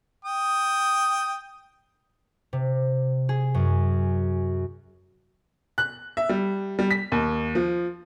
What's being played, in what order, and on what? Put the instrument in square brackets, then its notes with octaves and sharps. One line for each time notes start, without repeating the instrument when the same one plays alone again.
[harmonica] G5 D#6
[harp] C3
G#4
F#2
[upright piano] F#6
E5
G3
G3
B6
D#2
F3